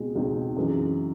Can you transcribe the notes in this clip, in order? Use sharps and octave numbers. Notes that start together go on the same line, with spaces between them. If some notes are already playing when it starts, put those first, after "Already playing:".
Already playing: C#2 B2 G#3 C4 D#4
C#2 B2 G#3 C4 D#4
F#2 C#3 E3 G#3